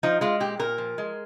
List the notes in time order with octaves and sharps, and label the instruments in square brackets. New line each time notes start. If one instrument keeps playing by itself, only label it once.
[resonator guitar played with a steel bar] F3 D#4
G#3 F4
A#2 G4
A#2 A#4
F3
G#3